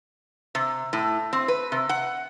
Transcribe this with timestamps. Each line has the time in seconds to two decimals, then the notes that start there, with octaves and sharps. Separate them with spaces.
0.55 C3
0.93 A2
1.33 C4
1.48 B4
1.72 C3
1.89 F#5